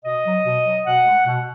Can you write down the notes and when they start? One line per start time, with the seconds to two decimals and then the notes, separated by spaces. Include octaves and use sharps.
0.05 B2 D#5
0.25 F#3
0.46 B2
0.66 F#3
0.86 B2 F#5
1.06 G#3
1.26 B2